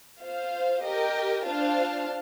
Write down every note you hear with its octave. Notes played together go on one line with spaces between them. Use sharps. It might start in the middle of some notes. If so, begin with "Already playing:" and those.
F4 C5 F5
G4 A#4 D#5 G5
D4 F4 C5 F5 A5